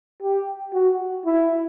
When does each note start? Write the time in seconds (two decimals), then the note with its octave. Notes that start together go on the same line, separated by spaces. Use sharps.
0.23 G4
0.74 F#4
1.26 E4